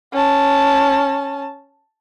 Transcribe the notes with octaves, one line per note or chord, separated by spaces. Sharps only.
C#4 A5